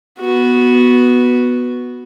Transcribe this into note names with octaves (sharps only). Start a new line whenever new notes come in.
B3 F#4